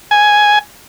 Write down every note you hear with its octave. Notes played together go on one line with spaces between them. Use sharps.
G#5